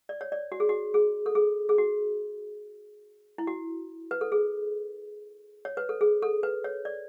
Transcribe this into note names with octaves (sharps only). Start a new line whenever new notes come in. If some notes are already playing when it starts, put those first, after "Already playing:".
D5
C#5
D5
F#4
G#4
F#4
G#4
A4
G#4
G#4
F#4
E4
F#4
B4
A4
G#4
C#5
B4
A4
G#4
A4
B4
C#5
D5